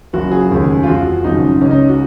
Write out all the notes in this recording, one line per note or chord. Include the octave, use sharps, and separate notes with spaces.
F#1 F#2 C#3 F3 F#4
G#4
F1 D#2 C#3 G#3
F4
F2 F3 G#3 F#4
G#1 F#2 C#3 F#3 D#4
C#2 C#3 G#3 C#4
D#4
F#4